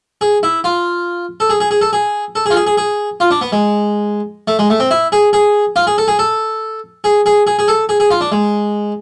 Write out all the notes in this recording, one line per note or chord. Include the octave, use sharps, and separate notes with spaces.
G#4
E4
F4
A4
G#4
G#4
G#4
A4
G#4
A4
G#4
F4
G#4
G#4
G#4
F4
D4
B3
G#3
A3
G#3
A3
C4
E4
G#4
G#4
F4
G#4
A4
G#4
A4
G#4
G#4
G#4
G#4
A4
G#4
G#4
F4
D4
G#3